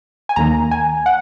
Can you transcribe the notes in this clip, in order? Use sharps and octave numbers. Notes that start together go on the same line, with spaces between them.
G#5
D#2 D#3 A#3 A#5
G#5
F#5